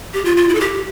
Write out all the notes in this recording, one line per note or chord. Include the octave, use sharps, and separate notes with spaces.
G4
F4
F4
E4
A4
G4